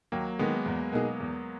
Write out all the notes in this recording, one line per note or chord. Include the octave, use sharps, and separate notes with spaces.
D#2 F#3 A#3
D#3 G#3 A#3 B3
E2
B2 A#3 D#4 G#4
E2